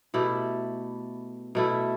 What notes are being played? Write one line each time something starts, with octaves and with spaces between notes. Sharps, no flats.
B2 A3 E4 G4
B2 A3 E4